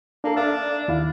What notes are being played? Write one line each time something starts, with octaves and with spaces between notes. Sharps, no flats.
A#3 D4 A4
D4 D5 E5 F5
D#2 E4 F5